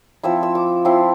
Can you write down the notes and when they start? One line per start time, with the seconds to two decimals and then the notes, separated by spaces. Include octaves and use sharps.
0.23 F3 C4 E4 E6
0.43 E6
0.55 D6
0.85 F3 C4 E4 C6